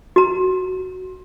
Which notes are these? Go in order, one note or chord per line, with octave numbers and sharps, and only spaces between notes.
F#4 A#5